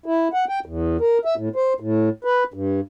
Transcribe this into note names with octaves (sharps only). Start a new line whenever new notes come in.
E4
F#5
G5
E2
A#4
E5
A2
C5
A2
B4
G2